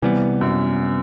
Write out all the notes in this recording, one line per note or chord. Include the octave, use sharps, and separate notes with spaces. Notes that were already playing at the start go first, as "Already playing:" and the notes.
C3 E3 G3 B3
F#2